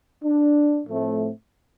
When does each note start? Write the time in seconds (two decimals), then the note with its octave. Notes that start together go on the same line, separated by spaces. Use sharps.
0.24 D4
0.87 A2 F3 A3 C4